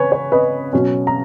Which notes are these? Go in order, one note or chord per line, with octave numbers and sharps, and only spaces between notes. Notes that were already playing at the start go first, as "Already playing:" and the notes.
Already playing: C#3 B4 C#5 G#5
C#5
B4 D#5
B2 F#3 C#4
A#5